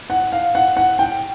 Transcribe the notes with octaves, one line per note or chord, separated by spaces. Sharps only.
F#5
F5
F#5
F#5
G5